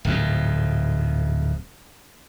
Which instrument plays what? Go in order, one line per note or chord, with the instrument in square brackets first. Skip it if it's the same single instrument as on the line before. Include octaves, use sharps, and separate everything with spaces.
[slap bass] D1 F2 G#2